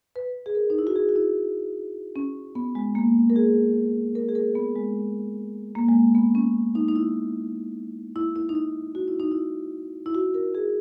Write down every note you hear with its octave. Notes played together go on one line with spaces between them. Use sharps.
B4
G#4
A#4
D#4
E4
F#4
G#4
F#4
E4
C#4
B3
G#3
A#3
A#4
G#4
A#4
G#4
A#4
B3
G#3
A#3
G#3
B3
C#4
D#4
D#4
E4
E4
E4
D#4
E4
F#4
E4
D#4
E4
E4
F#4
A#4
G#4